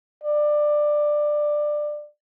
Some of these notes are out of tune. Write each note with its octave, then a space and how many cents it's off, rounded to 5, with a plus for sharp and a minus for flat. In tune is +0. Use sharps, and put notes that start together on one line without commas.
D5 +15